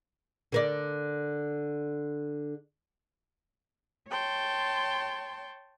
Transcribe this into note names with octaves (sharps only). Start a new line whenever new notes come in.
D3 A#4 D5
C#5 G5 A5 C6